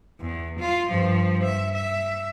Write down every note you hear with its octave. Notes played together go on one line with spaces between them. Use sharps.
E2
F4
G2 F3
E5
E5